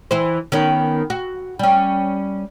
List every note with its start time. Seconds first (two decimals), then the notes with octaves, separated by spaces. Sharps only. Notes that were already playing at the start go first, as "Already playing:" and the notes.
0.11 E3 E4 C5
0.52 D#3 B3 C#4
1.10 F#4
1.59 G3 C#4